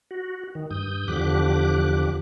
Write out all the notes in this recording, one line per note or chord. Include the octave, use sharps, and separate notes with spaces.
F#4
D#3
G2 D#6 G6
E2 D3 F3 G4 D6 F#6